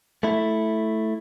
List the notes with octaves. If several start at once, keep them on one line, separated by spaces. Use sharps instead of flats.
A3 E4